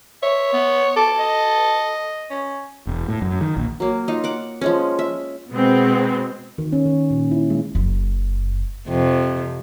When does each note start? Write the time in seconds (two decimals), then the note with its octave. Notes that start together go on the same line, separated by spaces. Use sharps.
0.23 C#5 E5
0.53 B3
0.96 A4 D6
1.19 D#5
2.30 C#4
2.87 E1
3.09 A2
3.22 F#2
3.41 D#3
3.57 A#1
3.80 F#3 A#3
4.08 D#4 F4
4.24 F#5 D6
4.61 F3 G#3 C#4
4.99 E5
5.51 B2 G#3 B3 C4
6.58 D#3
6.73 C#4
6.86 D#3
7.11 A#2
7.31 E4
7.50 G#3
7.75 F#1 F#2
8.88 F2 C3